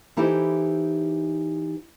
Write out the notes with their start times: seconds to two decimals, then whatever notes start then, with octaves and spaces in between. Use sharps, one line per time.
0.17 E3 D#4 E4 G4 A4 C5